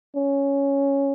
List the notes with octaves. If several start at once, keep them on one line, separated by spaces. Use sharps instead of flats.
C#4